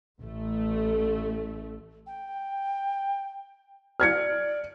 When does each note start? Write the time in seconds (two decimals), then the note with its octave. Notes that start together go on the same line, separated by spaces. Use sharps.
0.20 A1 A3
2.06 G5
4.00 D5 F6 G#6 C#7